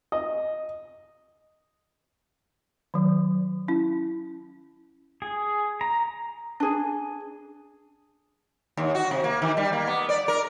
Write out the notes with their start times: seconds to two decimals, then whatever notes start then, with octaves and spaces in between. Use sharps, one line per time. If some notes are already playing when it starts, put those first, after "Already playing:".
0.12 D#5
2.94 D#3 F#3
3.68 C#4 E4
5.22 G#4
5.81 A#5
6.60 D4 G#4
8.77 D#2
8.95 F#4
9.11 C3
9.24 A#3
9.42 D#3
9.57 G3
9.73 A#3
9.87 B3
10.09 D5
10.28 A#4